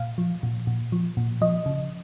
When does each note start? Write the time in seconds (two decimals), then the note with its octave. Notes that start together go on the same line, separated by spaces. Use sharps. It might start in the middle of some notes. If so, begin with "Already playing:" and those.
Already playing: A#2 F5
0.18 F3
0.43 A#2
0.67 A#2
0.92 F3
1.17 A#2
1.41 F3 D#5
1.66 C#3